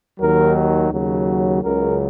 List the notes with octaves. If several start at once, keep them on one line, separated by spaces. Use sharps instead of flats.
D#2 D#3 F#3 A#4
D#2 C#3 F#3
C#2 C#3 F#3 A#4